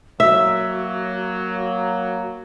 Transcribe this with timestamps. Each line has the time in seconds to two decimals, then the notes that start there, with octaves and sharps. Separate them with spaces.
0.20 F#3 A#3 F#4 E5